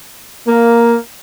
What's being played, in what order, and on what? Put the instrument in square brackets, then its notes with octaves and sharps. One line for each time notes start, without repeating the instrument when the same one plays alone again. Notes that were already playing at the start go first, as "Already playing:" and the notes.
[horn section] A#3